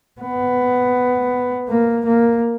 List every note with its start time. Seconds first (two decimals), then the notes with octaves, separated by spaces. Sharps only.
0.21 B3
1.69 A#3
2.06 A#3